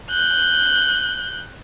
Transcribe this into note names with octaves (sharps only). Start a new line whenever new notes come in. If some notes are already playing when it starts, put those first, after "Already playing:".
F#6 G6